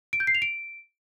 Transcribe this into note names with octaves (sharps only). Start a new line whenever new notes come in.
D7
G6
C7
F7
D7